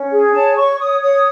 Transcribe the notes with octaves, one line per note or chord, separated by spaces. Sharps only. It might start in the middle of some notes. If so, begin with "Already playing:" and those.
Already playing: C#4
G#4
C#5 A5
C#5 C#6
C#5 D#6
C#5 D#6